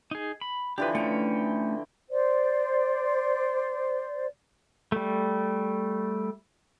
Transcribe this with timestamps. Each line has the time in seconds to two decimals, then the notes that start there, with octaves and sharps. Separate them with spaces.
0.11 D#4 G#4
0.41 B5
0.78 D3 E3 F3 G4 B4
0.95 A3 C#4 G5
2.10 C5 D5
4.92 G3 A3